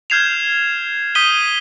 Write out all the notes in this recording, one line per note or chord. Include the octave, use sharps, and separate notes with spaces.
F6 G6 G#6 C7 E7 F7
D#6 G6 B6 D#7 G7